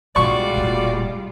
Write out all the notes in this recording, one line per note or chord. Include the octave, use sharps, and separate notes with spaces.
B1 B2 G3 G#3 F4 F#4 D5 C#6
E1 A#2